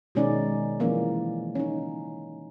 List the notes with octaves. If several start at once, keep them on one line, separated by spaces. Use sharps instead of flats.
B2 D#3 G#3 C#4 D#4 D5
E3 F3 A#3 C#4 D4
C#4 D#4